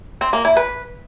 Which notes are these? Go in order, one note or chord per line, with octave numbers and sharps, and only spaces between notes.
C4
A#3
E4
B4